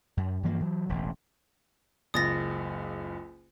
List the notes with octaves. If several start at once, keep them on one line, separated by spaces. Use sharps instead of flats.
F#2
G2 E3 F3 A#3
E3 F#3
E1 A1
F#1 C#2 D#6 A6 A#6